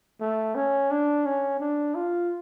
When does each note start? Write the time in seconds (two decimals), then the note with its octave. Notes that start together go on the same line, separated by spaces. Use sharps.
0.21 A3
0.55 C#4
0.91 D4
1.26 C#4
1.60 D4
1.95 F4